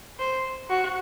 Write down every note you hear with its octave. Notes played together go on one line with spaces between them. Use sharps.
C5
F#4